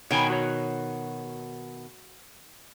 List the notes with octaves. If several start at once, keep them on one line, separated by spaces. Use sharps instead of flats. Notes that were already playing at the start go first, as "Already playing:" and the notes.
B2 D#3 C#5 G5 G#5
F#4 C#5